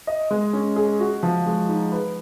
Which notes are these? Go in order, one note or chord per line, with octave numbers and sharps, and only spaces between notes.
D#5
G#3
C#4
G#4
F#4
F3
G#3
D#4
B4